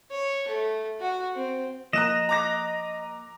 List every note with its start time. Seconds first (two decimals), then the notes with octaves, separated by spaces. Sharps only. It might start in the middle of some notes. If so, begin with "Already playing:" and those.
0.11 C#5
0.48 A3
1.01 F#4
1.36 C4
1.93 F3 A#3 D#5 A#5 F#6 E7
2.29 A#5 D6 A#6